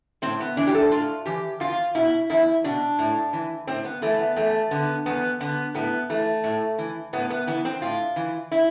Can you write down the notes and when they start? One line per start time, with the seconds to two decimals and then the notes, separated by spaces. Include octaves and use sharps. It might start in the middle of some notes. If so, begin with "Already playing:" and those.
0.22 A2 C4
0.40 B3
0.57 E3 D4
0.67 G4
0.75 A4
0.91 A2 F4
1.26 E3 G4
1.60 E2 F4
1.95 B2 E4
2.30 E2 E4
2.64 B2 D4
2.99 A2
3.33 E3
3.67 A2 C4
3.85 B3
4.02 E3 A3
4.19 B3
4.36 E2 A3
4.71 D3 B3
5.06 E2 B3
5.40 D3 B3
5.74 A2 B3
6.10 E3 A3
6.44 A2
6.78 E3
7.13 A2 B3
7.30 B3
7.47 E3 B3
7.65 C4
7.82 A2 F4
8.16 E3
8.51 E4